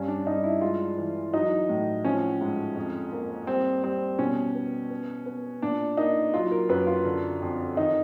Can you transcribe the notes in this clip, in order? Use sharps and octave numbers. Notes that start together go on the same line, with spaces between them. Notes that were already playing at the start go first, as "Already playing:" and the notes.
Already playing: G2 C#4
D4
G2 D#4
E4
G#3 F4
E3
F#3 D#4
A2
F3 C#4
G#2
F2
A#3
G3 C4
G3 C4
B2 C#4
B3
B3
B3
A#2 D4
A#3 D#4
F#3 F4
A#4
F#2 B4
F4
D3
F2
D#3 D#4